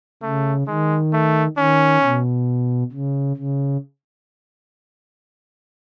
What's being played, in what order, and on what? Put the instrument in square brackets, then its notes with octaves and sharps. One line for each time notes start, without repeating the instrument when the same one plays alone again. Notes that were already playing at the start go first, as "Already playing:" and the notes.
[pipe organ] C#3 [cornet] A3
[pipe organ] D#3 [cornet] G#3
[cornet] A3
[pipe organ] D#3 [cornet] C#4
[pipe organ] B2
C#3
C#3